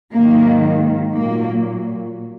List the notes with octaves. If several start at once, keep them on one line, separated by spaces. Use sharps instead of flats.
G#2 D#3 F#3 A#3
A#2 F#3 A#3